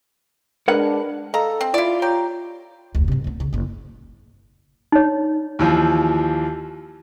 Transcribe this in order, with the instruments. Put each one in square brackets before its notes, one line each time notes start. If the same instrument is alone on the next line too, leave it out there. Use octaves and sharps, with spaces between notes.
[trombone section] G#3 D4 [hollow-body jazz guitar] A#4 B4 F#5
[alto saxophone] A4 [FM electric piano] D#5 F5 [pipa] A#5
[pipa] C4
[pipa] E4 D5 [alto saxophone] F4
[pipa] G4 [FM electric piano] C#5 A#5 G6
[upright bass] F1 D2
G2 C3
A3 B3
B1 C#3
F#1 A#2
[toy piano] D#4 C#5
[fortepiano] D#2 E3 F3